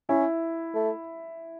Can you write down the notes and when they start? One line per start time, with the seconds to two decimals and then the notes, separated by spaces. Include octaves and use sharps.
0.09 C#4 E4
0.75 A3